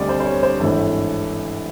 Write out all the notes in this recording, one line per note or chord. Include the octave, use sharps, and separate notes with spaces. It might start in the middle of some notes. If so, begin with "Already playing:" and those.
Already playing: D2 D3 G3 C4 D5 D#5
C5
C5
C#5
C5
G#1 G2 E3 A3 C#5